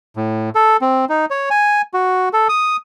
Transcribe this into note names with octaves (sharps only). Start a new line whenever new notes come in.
A2
A4
C4
D#4
C#5
G#5
F#4
A4
D#6